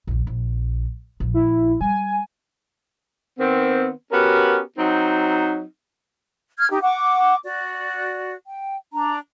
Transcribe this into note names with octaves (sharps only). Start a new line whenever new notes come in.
A#1 D#2
A#1
A#1
E4
G3 G#5
D#3 B3 C4
B3 C#4 F#4 G4 A#4
F#3 C4 D#4
F6 G#6
D#4 G4
F#5 C#6 D6
F#4 D5
G5
D4 A#5